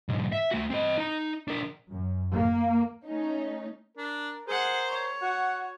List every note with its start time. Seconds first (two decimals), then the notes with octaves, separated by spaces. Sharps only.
0.09 B1 G#2
0.32 E5
0.51 A3 F#4
0.70 C4 D#5
0.98 D#4 A#5
1.48 D4 A#4
1.90 F#2
2.33 A#3
3.06 A3 C#4 D#4
3.97 D4 A#4
4.48 G#4 A#4 C5 F#5
4.88 C#5
5.22 F#4 F#5